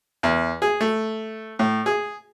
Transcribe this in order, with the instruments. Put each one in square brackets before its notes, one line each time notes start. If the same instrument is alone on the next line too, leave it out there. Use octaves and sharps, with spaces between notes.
[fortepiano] E2
G#4
A3
A2
G#4